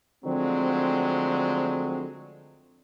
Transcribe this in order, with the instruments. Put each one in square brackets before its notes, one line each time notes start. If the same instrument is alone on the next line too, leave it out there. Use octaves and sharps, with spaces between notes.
[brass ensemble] D3 F3 F#3 G#3 A3 C4